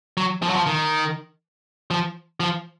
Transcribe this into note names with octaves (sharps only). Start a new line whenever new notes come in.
F#3
F3
F#3
F3
D#3
F3
F3